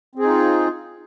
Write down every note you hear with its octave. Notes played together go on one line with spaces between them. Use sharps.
C4 D#4 F4 G#4